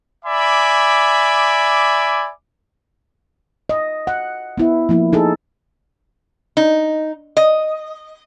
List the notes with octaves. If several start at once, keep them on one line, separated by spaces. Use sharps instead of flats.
D5 E5 G#5 B5 D6
D#5
F#5
B3 E4 E5
F3 A#3 E4
D#4 G#4 A4
D#4
D#5